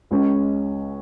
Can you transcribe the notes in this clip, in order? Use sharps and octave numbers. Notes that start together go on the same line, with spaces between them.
C#2 C#3 G#3 C#4